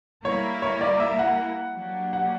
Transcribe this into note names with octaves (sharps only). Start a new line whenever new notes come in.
G3 A#3 E4 A#4 C#5
C#5
D5
E5
F#5
F#3 A#3 D4 G4
F#5